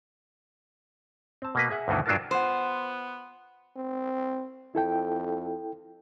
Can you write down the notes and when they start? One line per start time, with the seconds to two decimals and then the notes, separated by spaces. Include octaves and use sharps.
1.42 C4 A5
1.55 B2 A#3 B4
1.70 G#4 E5 F#5
1.88 D2 G2 B2 D#3 E3
2.06 G2 F#3 D4 F4 A#4 A5
2.31 B3 F4 C5 F#5
3.76 C4
4.75 F2 E4 A4 G5